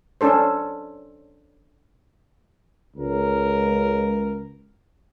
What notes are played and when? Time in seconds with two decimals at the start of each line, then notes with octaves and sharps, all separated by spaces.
0.21 C#4 D4 A4 C5
2.97 C#2 A#4